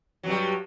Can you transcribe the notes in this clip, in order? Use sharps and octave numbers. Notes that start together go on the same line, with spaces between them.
G2 F#3 G3